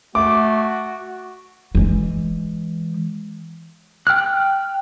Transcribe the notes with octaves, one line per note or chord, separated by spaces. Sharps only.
A3 F#4 D6
E3 G#3
G5 F6 F#6